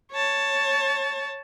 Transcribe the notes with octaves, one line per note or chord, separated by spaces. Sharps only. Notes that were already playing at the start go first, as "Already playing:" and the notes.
C#5 A5